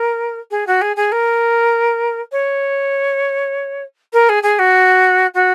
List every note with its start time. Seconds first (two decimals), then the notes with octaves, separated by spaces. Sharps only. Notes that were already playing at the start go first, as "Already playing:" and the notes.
Already playing: A#4
0.51 G#4
0.67 F#4
0.81 G#4
0.96 G#4
1.12 A#4
2.32 C#5
4.13 A#4
4.29 G#4
4.43 G#4
4.59 F#4
5.34 F#4